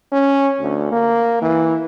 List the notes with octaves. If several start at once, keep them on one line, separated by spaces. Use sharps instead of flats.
C#4
D2
A#3
E3